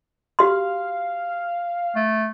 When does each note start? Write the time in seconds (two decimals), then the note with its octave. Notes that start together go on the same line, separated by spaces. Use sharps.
0.39 F#4 G4 F5 C6
1.95 A3